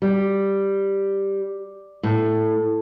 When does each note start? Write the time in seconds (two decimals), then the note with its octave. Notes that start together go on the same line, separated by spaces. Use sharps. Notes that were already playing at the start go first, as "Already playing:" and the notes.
0.02 G3
2.03 A2